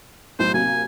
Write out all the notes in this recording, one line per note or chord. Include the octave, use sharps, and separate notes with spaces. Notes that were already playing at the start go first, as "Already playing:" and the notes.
B1 A2 C5
C3 F#3 A#3 G#5